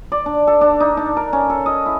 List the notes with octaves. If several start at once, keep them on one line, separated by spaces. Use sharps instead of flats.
D5
D4
A4
D4
D#4
D4
A#4
C#4
A4
D#5
E4